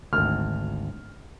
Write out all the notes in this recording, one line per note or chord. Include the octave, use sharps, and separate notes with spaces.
G#1 D2 F6